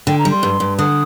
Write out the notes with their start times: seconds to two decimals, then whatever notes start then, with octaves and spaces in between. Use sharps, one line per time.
0.07 D3 G5
0.19 A#5
0.25 G3
0.31 C6
0.43 G2
0.60 G2
0.78 D3 D#6